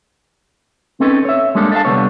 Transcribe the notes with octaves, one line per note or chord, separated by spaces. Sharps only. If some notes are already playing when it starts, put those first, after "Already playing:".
C4 C#4 D#4 A4 B4
C#5 E5
G3 G#3 A#3 D4 A4
A4 D5 D#5 F5 A5
C2 G#2 D3 G3 B3 C#5